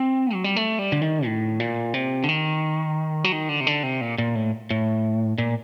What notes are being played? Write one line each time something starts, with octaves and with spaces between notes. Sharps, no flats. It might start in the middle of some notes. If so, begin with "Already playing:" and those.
Already playing: C4
F#3
G3
A3
G3
D3
D#3
A2
A#2
C3
D3
D#3
F#3
D#3
D3
C3
D3
C3
A#2
A#2
A2
A2
A#2